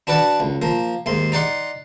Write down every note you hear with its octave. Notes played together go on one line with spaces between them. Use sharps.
D4 F#4 B4 D5 F#5 A5
C#2
F3 A#3
D#2 G#2 C6
D#4 D5 F#5 C6